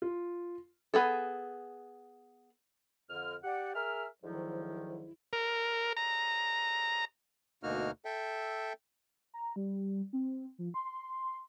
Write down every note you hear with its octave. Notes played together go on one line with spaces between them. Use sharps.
F4
B3 G#4 A4
F2 D3 F6
G4 D5 F#5
G#4 A#4 E5 F6
D2 G#2 D#3 F3 F#3 E4
A#4
A#5
D2 B2 A#3 D#4 F#4 F6
A4 E5 G5
A#5
G3
C4
F3
C6